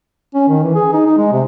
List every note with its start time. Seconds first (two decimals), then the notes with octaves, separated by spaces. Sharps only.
0.35 C#4
0.49 D#3
0.63 E3
0.75 G#4
0.93 D#4
1.06 D#4
1.18 G#3
1.33 C3